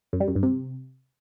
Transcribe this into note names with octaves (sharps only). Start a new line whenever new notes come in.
F#2
G3
F#2
G2
C3